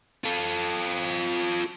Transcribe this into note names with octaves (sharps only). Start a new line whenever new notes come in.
F4 A4